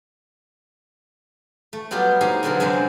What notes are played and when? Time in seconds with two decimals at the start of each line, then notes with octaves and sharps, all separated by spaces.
1.73 A3
1.91 F#3 G3 B3 F4 G4 D5
2.21 A#3 D#4 G4 G#4 C5
2.43 B2 D3 F#3 C4 A4 A#4
2.60 F#2 C3 G#3 D4 C5 E5